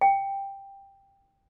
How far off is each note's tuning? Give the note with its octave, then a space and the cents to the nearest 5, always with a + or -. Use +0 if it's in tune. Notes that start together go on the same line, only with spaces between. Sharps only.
G5 +5